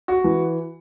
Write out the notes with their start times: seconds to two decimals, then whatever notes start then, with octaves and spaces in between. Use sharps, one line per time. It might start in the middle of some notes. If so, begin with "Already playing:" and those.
0.08 F#4
0.24 E3